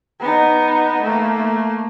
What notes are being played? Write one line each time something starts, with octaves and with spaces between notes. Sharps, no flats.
B3 D#4
A3 A#3